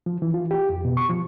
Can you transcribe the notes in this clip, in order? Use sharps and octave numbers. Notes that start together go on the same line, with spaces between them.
F3
E3
F4
G4
F2
B2
C#6
F3